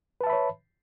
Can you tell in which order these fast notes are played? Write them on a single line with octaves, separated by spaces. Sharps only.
B4 A5 E5 B5 C#5